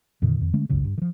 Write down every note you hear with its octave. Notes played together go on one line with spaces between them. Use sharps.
F2 A#2 D3 D#3
F2 D#3
D3 G#3 A3 C#4
G#1 C#2 F#2 C#3
G2
D#3 F3